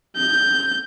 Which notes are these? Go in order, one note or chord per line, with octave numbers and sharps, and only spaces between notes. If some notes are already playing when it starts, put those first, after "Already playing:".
G6